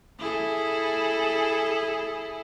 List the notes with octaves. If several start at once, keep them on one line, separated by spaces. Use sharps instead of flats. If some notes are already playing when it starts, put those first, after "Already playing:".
E4 G#4 A4